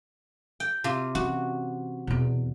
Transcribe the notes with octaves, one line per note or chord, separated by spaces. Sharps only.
G5
C3 F4
E3 C#4 F#4
E2 B2